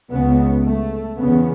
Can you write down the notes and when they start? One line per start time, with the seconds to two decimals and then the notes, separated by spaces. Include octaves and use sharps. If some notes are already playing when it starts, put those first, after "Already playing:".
0.10 C#2 C#3 B3
0.64 A3
1.18 E2 C#3 B3